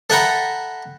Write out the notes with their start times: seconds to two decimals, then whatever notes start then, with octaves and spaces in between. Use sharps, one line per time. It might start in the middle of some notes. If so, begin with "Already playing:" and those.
0.10 A4 E5 F#5 G5 A#5 B5